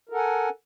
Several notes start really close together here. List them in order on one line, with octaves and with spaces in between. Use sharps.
A#4 A4 F#5 G#5